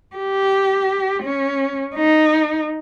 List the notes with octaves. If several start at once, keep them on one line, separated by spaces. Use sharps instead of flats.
G4
C#4
D#4